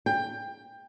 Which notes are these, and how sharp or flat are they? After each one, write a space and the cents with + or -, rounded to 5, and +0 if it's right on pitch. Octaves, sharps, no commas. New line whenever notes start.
G5 +15